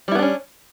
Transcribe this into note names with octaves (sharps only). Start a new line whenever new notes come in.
G3 B3 C#4 D4 E4